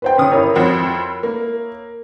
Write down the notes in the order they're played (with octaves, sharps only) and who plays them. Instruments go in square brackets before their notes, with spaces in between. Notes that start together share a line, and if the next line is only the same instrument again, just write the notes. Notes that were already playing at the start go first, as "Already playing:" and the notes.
[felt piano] B4 C5 G5
[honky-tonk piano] G1 D#6 [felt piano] C#4
[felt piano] E4 A#4 C#5
[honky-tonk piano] F2 C4 F#4
A#3